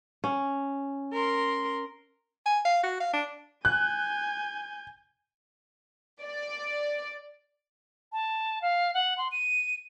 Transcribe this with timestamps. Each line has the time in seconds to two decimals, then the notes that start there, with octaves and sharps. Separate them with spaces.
0.24 C#4
1.13 A#4 C6
2.46 G#5
2.65 F5
2.83 F#4
3.00 F5
3.13 D4
3.65 G#5 F#6 G6
6.23 D5
8.12 A5
8.62 F5
8.94 F#5
9.18 C6
9.32 D#7